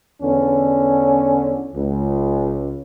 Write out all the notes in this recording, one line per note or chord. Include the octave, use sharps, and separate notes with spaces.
E2 D3 C#4
C#2